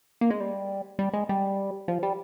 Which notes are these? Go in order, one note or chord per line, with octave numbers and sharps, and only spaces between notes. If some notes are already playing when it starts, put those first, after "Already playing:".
A#3
G#3
G3
G3
G#3
G3
F3
G3